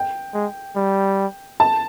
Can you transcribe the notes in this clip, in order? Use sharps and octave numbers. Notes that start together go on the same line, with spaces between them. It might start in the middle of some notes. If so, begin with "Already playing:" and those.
Already playing: G5
G#3
G3
A5